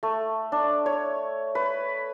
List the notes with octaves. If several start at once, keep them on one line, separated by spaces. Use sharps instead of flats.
A3
D4
C#5
B4